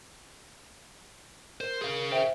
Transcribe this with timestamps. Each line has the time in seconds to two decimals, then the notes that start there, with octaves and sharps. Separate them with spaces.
1.61 A#4 C5
1.81 G#4 F5
2.12 C5 E5 G5